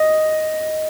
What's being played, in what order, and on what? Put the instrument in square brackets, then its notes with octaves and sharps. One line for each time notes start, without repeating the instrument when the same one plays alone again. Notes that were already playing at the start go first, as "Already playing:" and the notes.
Already playing: [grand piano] D#5